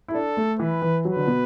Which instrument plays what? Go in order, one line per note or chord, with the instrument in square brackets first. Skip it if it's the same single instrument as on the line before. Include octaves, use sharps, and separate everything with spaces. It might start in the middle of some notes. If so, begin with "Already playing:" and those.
[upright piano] E4
[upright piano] D4 [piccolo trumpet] A4
[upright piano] A3
[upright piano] E3 [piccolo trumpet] B4
[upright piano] E3
[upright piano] F#3 [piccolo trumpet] B4
[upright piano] D3
B2